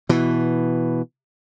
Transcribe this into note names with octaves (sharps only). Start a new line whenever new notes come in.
B2 E3